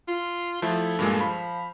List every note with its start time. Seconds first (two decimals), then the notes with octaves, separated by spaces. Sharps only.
0.08 F4
0.62 F3 A3 E4
0.99 G2 A#2 G#3
1.20 F3 B5